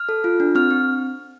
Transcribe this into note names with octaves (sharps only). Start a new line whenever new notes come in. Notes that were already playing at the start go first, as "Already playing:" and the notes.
Already playing: F6
A4
F4
D4
C4 F6
C4